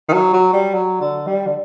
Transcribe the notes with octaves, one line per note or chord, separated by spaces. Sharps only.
D#3
F#3
F#3
G3
F#3
D3
G3
D3